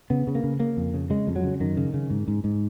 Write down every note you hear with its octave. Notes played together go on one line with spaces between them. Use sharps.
C#3 B3
C#3
A#3
C#3
C#3 A#3
F2
C#3
C#3 G#3
F2
F#3
C#3
F#2 D#3
C#3
C#3
G#2
G#2
G#2